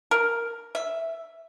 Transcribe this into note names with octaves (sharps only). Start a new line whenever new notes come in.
A#4
E5